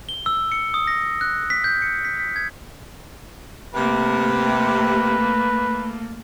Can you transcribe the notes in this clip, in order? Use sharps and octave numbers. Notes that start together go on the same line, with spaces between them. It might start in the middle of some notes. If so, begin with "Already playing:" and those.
G7
E6
C#7
D#6
A#6
F#6
B6
G6
C#7
B6
B6
G#6
C3 A3 A#3 B4